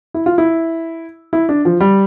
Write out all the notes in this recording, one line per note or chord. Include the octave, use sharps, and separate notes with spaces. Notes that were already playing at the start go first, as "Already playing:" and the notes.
E4
F4
E4
E4
D4
F3
G3